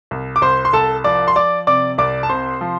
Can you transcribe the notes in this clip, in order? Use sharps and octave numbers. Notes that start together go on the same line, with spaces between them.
C2
D6
C2 C5 C6
C6
C2 A4 A5
F3 D5 D6
C6
F3 D5 D6
C3 D5 D6
C2 D5 D6
A5
C3 C5 C6
F3